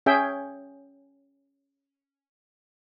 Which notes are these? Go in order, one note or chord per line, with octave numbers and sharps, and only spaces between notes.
C#4 G#4 E5 G5